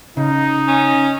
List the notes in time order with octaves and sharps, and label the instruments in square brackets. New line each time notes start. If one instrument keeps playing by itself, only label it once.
[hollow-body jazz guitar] C#3 [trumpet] D#4
[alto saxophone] C#4